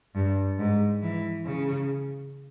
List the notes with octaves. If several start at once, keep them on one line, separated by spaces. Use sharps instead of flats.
G2
G#2
E3
C#3